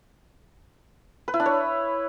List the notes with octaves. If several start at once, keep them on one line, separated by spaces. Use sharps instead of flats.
B4
E4
D4
C#5